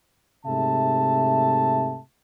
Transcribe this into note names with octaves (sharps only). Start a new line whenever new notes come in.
G#2 C3 A3 E5 A5